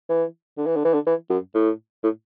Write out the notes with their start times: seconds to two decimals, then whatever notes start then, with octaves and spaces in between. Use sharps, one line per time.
0.09 E3
0.57 D3
0.66 E3
0.76 D3
0.85 E3
0.94 D3
1.07 E3
1.30 F#2
1.55 A2
2.03 A2